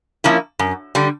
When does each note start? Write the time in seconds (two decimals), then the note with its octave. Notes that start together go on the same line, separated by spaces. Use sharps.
0.24 F3 A#3 C#4 E4
0.59 F#2
0.95 D3 G3